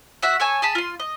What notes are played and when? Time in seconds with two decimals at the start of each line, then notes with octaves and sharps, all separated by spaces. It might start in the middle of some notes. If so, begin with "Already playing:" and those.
0.23 F#4 E5 F#5
0.40 A4 C#5 G#5
0.62 G#4 A5 B5
0.75 F4 C6
1.00 D#5